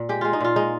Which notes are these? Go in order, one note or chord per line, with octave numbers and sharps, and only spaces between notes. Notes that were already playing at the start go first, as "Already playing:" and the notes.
Already playing: A#2
G#3 G4
G#3 F4
D#4
A#2 F4
G#3 D#4